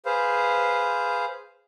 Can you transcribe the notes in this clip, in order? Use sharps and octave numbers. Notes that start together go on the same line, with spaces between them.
G#4 B4 C5 F5